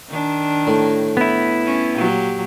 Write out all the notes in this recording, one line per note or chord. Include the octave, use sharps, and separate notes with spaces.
D#3 D4
A2
B3 E4
C#4
A#2 F#3 G4